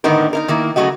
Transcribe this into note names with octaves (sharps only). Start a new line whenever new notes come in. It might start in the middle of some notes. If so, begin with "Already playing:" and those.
A2 D3 D#3 B3 D#4 A#4
D#4 E4 A#4
D#3 A#3 E4
C#3 F#3 A3 F#4 D#5